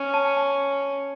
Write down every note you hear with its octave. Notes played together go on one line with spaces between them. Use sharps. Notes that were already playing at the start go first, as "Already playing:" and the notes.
Already playing: C#4
A5
A5